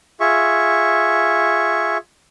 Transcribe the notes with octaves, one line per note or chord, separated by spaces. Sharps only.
F4 G#4 E5 C#6